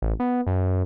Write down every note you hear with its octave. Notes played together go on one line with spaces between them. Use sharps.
A1
B3
F#2